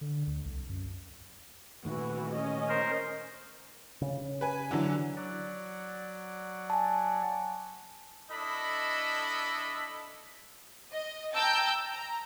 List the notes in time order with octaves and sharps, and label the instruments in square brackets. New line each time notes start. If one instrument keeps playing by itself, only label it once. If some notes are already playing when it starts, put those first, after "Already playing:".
[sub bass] D3
D2
C2
F#2
[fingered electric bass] A#2 D#3 A3 [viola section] E3 F#4
[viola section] C#4 D#5
[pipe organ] A#4 C5
[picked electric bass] C#3 C#4
[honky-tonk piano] B4 G#5
D3 E3 F#3
[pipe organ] F#3 D5 F#5
[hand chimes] G#5 A5
[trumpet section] D4 E4 A4 D#5 B5
[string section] D#5
G5 A5 A#5 E6 G6
A#5